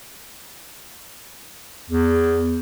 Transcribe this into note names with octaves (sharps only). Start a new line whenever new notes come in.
E2